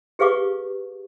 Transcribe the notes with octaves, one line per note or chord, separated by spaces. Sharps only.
G4 G#4 B4 F5 C#6 D6